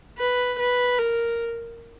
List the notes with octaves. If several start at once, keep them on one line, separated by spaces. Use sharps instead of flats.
B4
B4
A#4